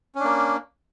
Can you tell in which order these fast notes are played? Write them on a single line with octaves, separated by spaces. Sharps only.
C#4 D4 A#3